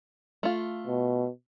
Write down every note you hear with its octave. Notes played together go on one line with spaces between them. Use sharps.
A3 F4
B2